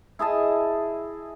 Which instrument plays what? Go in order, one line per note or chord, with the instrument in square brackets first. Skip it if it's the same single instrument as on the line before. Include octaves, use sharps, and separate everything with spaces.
[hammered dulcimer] E4 G#4 D#5 A5